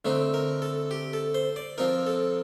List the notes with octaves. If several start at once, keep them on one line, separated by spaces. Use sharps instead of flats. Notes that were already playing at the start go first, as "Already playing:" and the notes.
D3 A3 C4 D#4
A#4
A4
G4
A4
C5
D5
F3 C4 D#4 A#4
A4